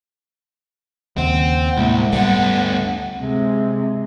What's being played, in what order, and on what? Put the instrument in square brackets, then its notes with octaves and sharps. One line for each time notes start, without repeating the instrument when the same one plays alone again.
[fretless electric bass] D#2 C#3 [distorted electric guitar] C4 [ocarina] F#5
[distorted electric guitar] C2 [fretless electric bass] A2 G#3 A#3
[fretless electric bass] D2 G3 [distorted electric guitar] D3 B3 [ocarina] F#5
[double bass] C3 G#3